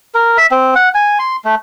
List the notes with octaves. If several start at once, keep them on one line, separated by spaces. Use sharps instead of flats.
A#4
E5
C4
F#5
G#5
C6
A3